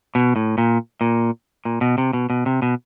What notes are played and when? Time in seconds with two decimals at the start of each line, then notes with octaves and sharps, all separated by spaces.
0.15 B2
0.36 A2
0.58 A#2
1.01 A#2
1.65 A#2
1.81 B2
1.98 C3
2.13 B2
2.30 B2
2.46 C3
2.62 B2